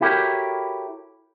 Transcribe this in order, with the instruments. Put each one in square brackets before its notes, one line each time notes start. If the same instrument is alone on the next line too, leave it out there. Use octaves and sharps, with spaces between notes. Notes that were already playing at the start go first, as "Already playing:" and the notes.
[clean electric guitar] E4 F#4 G4 A4 A#4 C#5